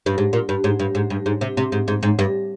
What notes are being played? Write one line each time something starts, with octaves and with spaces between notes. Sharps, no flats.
G2
G#2
A#2
G2
G#2
G2
G#2
G2
G#2
C3
C3
G#2
G#2
G#2
G2